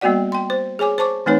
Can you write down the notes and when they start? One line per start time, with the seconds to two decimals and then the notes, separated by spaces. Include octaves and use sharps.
0.01 G3 A#3 B3 F#4 D5 F#5
0.32 G5 C6
0.50 C5
0.79 G#4 C#5 G#5 D6
0.98 C5 A5 C#6 D6
1.26 E3 A3 C4 D#4 B4 C#5